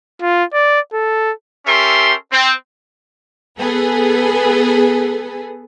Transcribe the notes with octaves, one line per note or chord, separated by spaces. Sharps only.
F4
D5
A4
C#4 G4 A4 A#4 E5 C6
C4
B3 G#4 A4 B4